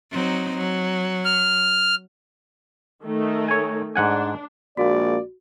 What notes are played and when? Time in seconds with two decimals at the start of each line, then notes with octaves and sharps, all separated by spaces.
0.11 F#3 C4 D#4
0.57 F#3
1.25 F6
3.04 D#3 A3 D#4
3.48 C#5 G#5
3.95 G#2 D4 F#5 G#5
4.77 A#1 G#3 A#3 F#4 D5